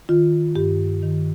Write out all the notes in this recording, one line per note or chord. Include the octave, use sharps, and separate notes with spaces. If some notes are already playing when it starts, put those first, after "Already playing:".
D#3 F4
G2 G4
D#3